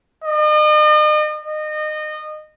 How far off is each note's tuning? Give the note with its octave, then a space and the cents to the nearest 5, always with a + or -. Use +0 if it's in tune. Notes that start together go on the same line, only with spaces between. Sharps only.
D#5 -40
D#5 -25